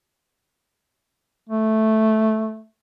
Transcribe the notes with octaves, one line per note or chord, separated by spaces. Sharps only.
A3